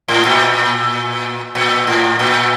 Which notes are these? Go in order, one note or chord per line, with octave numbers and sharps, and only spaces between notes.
A2
A#2
A#2
A2
A#2